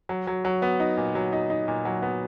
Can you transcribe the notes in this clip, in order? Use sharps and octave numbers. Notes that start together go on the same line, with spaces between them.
F#3
F#3
F#3
B3
D#4
A#2
F#3
D#4
D#4
A#2
F#3
B3